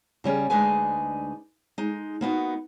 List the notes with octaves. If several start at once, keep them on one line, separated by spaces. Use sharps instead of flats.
C#3 G3 C#4 G#4
D2 G#3 D4 D#4 B4 G#5
G#3 D#4
A#3 B3 D#4 F#4